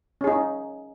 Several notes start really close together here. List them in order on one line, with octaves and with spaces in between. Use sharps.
C#4 G#4 D#4